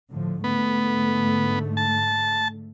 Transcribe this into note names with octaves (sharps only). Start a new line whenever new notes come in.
A2 D3 F3
G#2 D3 A3 B3
A5